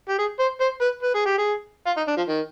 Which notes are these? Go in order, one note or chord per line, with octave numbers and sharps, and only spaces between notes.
G4
G#4
C5
C5
B4
B4
G#4
G4
G#4
F4
D#4
D4
F3
D#3